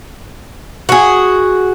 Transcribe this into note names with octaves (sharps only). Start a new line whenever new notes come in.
F#4 G#4